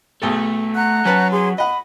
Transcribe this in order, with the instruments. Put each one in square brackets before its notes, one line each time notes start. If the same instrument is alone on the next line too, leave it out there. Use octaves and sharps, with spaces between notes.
[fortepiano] B1 G#4 A5 [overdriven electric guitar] A3
[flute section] F#5 A#5 F#6
[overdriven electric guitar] F#3 [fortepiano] C#4 B4 A5
[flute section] G#4 C#5 C6
[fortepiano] D#5 F#5 [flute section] B5